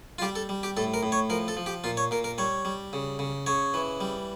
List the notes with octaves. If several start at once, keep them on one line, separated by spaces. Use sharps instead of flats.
F4
G3 G4
A4
G3
G4
A2 A4
A#4
A2
C#5
F3 A#4
A4
F3
G4
A#2 F4
C#5
A#2 A#4
A#4
G3 C#5
G3
C#3
C#3
C#3 C#5
E3
G3